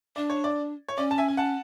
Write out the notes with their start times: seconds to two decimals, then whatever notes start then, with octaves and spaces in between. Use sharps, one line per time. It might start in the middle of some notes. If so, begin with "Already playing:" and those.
0.16 D4 D5
0.30 C#5
0.44 D5
0.89 C#5
0.97 C#4 D5
1.11 A5
1.18 E5 G#5
1.28 G#5
1.37 F#5 A5